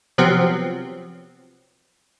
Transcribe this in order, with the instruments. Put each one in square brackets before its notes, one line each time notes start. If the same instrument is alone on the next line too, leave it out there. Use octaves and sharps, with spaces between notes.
[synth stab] C3 F3 F#3 B3 C4